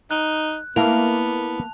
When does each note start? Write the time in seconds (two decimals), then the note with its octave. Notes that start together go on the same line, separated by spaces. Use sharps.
0.11 D#4 F#6
0.76 A#3 B3 E4 A#4 F5 A5 F7